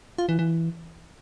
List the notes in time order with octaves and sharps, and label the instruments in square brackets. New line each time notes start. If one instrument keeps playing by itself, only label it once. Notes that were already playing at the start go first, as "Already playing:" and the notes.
[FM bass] F4
E3
E3